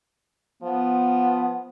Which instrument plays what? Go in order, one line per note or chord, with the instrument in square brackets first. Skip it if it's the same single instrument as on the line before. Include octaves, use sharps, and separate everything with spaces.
[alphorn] F3 [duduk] B3